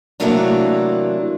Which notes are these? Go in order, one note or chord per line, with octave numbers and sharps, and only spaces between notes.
C3 E3 F#3 A3 A#3 D4